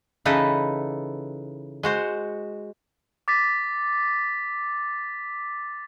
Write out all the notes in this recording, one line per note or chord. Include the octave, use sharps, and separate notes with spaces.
C#3 E3 D#4 A4 B4
G#3 F#4 C5
D6 A6 B6